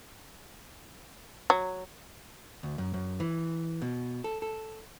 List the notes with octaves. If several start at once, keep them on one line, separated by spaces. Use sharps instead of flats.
F#3
D2
F#2
F#2
E3
B2
A4
A4